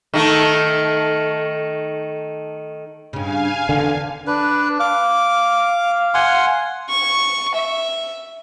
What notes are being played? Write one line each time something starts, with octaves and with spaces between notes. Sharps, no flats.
D#3 A3
G2 C#3 F5 G#5
E2 D3 D#3
D4 B4
F5 D6
F#5 G#5 C6
C#6
E5